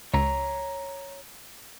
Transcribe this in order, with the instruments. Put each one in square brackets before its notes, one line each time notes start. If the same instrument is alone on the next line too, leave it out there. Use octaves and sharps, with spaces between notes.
[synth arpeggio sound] C#2 [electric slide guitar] C#5 A#5